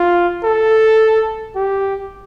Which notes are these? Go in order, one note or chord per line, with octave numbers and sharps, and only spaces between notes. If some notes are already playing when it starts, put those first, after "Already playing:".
Already playing: F4
A4
G4